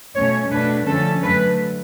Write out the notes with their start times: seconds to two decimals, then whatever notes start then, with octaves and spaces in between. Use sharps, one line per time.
0.16 B2 A3 C#4 C#5
0.52 B2 A3 D4 B4
0.87 D3 F3 A3 C#4 A4
1.24 D3 F#3 A3 B4